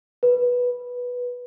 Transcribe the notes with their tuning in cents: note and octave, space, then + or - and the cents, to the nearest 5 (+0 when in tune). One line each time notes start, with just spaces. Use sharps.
B4 -10